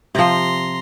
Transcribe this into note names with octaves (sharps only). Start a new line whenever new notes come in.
C3 F3 A#5 C6